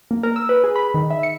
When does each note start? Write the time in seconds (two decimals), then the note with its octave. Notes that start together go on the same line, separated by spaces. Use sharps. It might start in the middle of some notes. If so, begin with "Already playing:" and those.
0.11 A#3
0.23 A#4
0.36 E6
0.49 B4
0.64 G#4
0.76 B5
0.94 D#3
1.10 E5
1.23 C#7